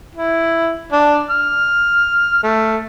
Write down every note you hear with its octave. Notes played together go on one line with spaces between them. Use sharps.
E4
D4
F6
A3